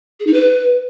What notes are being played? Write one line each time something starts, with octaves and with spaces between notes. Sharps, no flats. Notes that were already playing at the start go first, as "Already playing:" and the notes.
G#4
D#4
B4